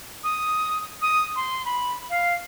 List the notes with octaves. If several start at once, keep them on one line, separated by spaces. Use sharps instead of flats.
D#6
D#6
C6
B5
F5